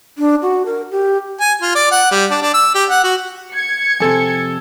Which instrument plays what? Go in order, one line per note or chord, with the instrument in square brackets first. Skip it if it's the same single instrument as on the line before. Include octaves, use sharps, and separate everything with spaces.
[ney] D4
F#4
A#4
G4
[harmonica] G#5
F4
D5
F#5
G3
D4
D4
E6
G4
F#5
F#4
[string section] G#6 C#7
[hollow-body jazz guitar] F2 C3 [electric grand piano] A4 G#5